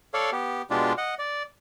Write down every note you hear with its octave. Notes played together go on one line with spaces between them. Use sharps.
A4 C#5 D5 F5
B3 G4
B2 G#3 D4 F4 G4
D#5 F#5
D5